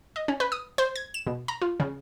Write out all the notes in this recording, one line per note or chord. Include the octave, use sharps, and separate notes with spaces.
D#5
C#4
B4
D#6
C5
G#6
E7
B2
A#5
F4
C#3